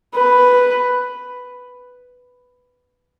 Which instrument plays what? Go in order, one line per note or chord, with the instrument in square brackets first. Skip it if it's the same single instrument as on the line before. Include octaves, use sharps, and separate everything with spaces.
[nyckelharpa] B4